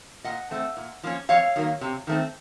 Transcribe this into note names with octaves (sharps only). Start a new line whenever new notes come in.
A#2 D#5 F#5
A3 C4
A#2
F3 A#3 C#4
F2 C#5 F5
D#3 F#3 A#3
C3
D#3 A3 C4